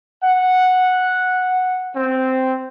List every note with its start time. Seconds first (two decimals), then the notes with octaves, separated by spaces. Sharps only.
0.24 F#5
1.96 C4